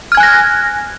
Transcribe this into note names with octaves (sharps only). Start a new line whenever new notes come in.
G#5 F6 F#6 G#6 A#6